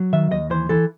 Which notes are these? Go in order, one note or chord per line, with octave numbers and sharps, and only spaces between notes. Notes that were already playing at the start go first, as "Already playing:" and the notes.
Already playing: F#3
D#3 E5
D#2 D#5
E3 C5
E3 A4